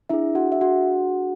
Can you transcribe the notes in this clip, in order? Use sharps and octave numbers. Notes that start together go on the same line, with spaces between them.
D4 E4 G#4 E5
F#4 F#5
E5
F#4 F#5